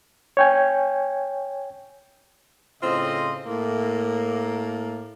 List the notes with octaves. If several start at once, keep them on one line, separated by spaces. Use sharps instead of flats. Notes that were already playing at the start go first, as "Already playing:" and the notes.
C#5 G5 G#5
A2 C#3 C4 F4 D#5
A2 A#3